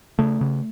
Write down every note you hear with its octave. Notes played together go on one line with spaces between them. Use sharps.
C#3 A3
C#3